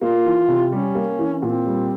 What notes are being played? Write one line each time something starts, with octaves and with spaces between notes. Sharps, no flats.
A#3 F4
E3
C3
G3 C#4
A#3
E3
A#2 C4
G3